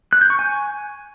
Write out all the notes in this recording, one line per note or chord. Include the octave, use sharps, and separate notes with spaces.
F#6
G6
C#6
G#5